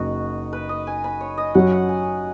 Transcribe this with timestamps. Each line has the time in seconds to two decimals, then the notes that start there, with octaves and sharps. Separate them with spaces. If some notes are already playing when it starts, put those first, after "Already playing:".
Already playing: F#1 D#4 F#4
0.53 B4
0.69 D#5
0.87 G#5
1.04 B5
1.21 C#5
1.37 D#5
1.54 F#2 F#3 C#4 F#5
1.72 F#5
1.89 G#5